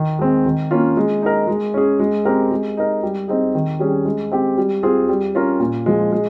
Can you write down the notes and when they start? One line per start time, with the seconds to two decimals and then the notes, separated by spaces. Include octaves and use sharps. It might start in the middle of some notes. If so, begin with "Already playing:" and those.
Already playing: D#3
0.19 G#3 C4
0.45 D#3
0.71 A#3 C#4 F4
0.97 G#3
1.22 D#4 A#4
1.47 G#3
1.74 C#4 G#4
2.00 G#3
2.25 C4 G4 A#4
2.51 G#3
2.77 D#4 A#4
3.03 G3
3.28 C4 D#4 G#4
3.55 D#3
3.80 G3 C#4 G#4
4.05 G#3
4.32 C4 G4
4.58 G3
4.83 C4 F4 G#4
5.09 G3
5.35 C#4 F4 A#4
5.60 A#2
5.86 F3 G#3
6.12 G#3